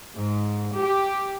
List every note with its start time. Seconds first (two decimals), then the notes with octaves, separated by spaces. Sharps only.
0.15 G#2
0.76 G4